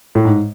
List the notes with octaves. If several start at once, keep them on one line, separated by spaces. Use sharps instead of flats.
A2
G#2